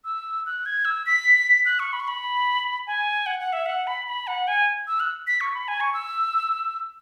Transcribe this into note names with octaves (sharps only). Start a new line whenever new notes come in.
E6
F#6
G#6
E6
B6
F#6
C#6
B5
C#6
B5
G#5
F#5
F#5
E5
F#5
B5
B5
F#5
G#5
E6
F#6
B6
C#6
B5
G#5
C#6
E6